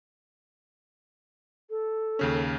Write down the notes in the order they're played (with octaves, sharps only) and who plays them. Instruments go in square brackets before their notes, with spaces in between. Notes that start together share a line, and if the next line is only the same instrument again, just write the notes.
[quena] A4
[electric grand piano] D#2 C#3 C#4